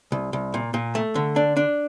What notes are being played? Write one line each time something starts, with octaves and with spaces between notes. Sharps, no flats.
C2
C2
A#2
A#2
A3
D3
D4
D4